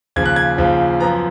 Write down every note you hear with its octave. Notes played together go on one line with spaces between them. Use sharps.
D#2 C#3 F3 G#6
F#6
G#6
D#2 C#3 F3
F#2 F3 B3 A#5